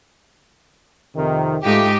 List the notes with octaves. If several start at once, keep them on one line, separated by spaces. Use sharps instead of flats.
F2 C3 D#3
G#2 G#3 A3 D#4 F4 G4